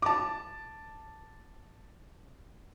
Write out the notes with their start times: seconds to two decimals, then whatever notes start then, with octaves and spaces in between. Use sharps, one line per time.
0.02 A5 D6